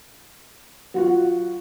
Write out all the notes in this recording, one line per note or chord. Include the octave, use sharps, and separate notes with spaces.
F#3 F4 F#4